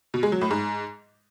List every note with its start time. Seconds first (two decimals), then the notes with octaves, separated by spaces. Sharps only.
0.14 B2
0.23 G#3
0.32 F#3
0.41 A2
0.51 G#2